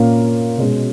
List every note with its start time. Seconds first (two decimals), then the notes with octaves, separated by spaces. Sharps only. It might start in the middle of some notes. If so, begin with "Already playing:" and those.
Already playing: A#2 A#3 C#4
0.57 B2 G#3 C#4